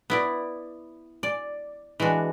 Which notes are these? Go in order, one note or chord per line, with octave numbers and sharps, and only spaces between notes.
B3 E4 D5
D5
E3 G#3 D4 F#4